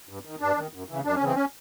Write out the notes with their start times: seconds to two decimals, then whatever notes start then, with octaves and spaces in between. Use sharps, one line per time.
0.09 G2
0.25 D#3
0.41 G2 D4
0.57 D#3
0.74 F#2
0.89 C#3 E3
1.05 F#2 D4
1.15 C#4
1.21 C#3 E3 C4
1.35 C#4